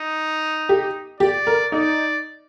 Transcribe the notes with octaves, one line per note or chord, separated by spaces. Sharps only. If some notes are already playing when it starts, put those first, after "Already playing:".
Already playing: D#4
G4
G4 D5
A#4
D#4 D5